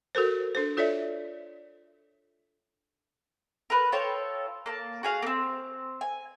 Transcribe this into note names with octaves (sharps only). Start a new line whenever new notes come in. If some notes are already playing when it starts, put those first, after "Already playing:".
F#4 A4 A#4 C5
D4 A4 C5
F4 A4 C#5 D5 E5
A#4 B4
F4 A4 C#5 G5
A#3 A5
F#4 G#4 F5
A#3 C4
G#5